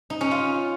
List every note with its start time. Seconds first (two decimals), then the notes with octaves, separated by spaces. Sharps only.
0.10 D#4
0.21 C#4
0.31 F4